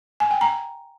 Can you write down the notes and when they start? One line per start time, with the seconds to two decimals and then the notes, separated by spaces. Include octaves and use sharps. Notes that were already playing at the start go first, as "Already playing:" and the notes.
0.20 G#5
0.31 G5
0.41 A#5